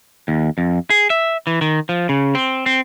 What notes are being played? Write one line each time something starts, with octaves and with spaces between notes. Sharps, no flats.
D#2
F2
G#4
E5
E3
D#3
F3
C#3
C4
C4